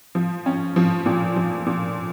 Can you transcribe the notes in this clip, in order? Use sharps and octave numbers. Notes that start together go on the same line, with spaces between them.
F3
C#4
F3
A#2
F3
A#2